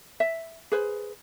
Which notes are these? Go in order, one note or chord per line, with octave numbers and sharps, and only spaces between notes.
E5
G#4 B4 C5